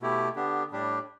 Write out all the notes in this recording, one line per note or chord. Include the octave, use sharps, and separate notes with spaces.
B2 A3 E4 G4
D3 B3 D4 G4
A2 G3 D4 G4